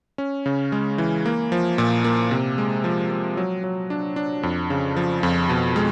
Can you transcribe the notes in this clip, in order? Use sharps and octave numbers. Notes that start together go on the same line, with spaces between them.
C#4
C#3
G#3
E3
A#3
F3
A#2
A#3
C3
G#3
F3
F3
F#3
F#3
D4
D4
F2
C#3
F3
F2
B2
G#3